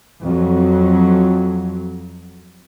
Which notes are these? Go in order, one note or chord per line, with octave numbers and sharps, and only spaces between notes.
F2 F#3